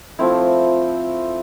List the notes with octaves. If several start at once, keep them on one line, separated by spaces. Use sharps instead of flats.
F3 A3 C4 E4